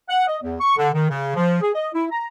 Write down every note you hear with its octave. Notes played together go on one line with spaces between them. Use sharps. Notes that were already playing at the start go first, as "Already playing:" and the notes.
F#5
D#5
E2
C#6
D3
D#3
C#3
F3
G#4
D#5
E4
A#5